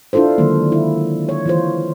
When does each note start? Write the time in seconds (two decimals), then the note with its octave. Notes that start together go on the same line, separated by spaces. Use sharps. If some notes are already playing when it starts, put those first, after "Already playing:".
0.13 D4 E4 F4 A4 C5
0.38 D3 D#3 F#3 G#3 A#3
0.72 E4
1.29 C#5
1.46 E3 F4 C5